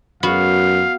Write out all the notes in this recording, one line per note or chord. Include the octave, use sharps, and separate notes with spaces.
F#2 B3 F#4 F5